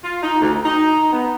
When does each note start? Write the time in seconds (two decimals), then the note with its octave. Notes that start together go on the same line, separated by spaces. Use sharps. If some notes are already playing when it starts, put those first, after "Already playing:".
0.04 F4
0.23 D#4
0.41 D2
0.65 D#4
1.12 B3